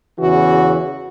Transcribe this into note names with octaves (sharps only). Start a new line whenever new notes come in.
E2 C#3 E3 F#4